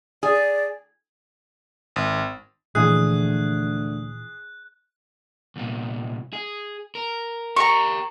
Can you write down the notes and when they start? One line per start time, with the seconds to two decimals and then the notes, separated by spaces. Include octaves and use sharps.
0.23 G#4 D5
1.96 G#1
2.75 D2 A#2 E3 F3 G#4 F#6
5.56 C2 A#2
6.33 G#4
6.95 A#4
7.56 G4 A#4 A#5 C#6